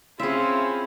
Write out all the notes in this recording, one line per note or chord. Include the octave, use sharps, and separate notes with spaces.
C4 C#4 E4 F4 G#4 E5